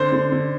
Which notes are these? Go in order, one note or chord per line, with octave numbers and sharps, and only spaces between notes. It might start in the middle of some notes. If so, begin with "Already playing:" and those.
Already playing: D3 C5
D3
D3